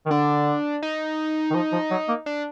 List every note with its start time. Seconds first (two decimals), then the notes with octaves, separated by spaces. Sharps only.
0.06 D#3
0.10 D3 D4
0.83 D#4
1.50 D#3
1.54 F3
1.72 F3
1.90 F#3
2.08 A#3
2.26 D4